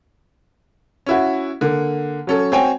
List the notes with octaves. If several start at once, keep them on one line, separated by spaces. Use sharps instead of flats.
C#4 E4 F#4
D3 A#3
F#3 C#4 A4
C4 F#4 C#5 G5 G#5